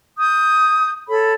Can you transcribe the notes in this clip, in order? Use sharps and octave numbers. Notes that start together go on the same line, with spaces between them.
D#6 G6
A4 C#5 B5